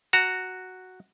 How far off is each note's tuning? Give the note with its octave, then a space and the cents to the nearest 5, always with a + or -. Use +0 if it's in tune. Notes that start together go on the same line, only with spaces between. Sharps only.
F#4 +0 A#5 -15